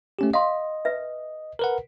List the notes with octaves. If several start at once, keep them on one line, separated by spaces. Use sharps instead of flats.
A3 C#4 G4
D#5 F5 C6
B4 E5
A#4 B4 F#5